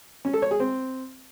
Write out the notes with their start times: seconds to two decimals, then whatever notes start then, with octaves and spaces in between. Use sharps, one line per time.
0.25 C#4
0.33 A4
0.42 C#5
0.51 G#4
0.60 C4